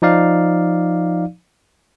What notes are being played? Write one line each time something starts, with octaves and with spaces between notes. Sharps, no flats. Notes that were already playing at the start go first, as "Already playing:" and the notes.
F3 D#4 D5 F5